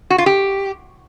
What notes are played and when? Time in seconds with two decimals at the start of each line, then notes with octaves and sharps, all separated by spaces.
0.10 F#4
0.18 F4
0.26 G4